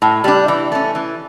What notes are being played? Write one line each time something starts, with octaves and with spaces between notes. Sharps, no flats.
A2
G3 D4
E3
A3 C#4
E3